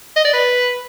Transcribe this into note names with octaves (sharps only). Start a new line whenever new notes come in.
D#5
D5
B4